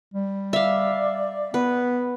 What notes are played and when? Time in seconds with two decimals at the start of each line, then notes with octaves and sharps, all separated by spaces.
0.14 G3
0.53 D5 E5 F5
1.54 B3 B4